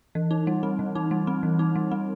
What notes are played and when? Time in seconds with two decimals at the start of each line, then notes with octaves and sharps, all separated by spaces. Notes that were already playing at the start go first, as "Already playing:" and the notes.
0.15 E3
0.31 D#4
0.47 G3
0.63 C4
0.79 E3
0.95 D#4
1.11 G3
1.27 C4
1.43 E3
1.59 D#4
1.76 G3
1.91 C4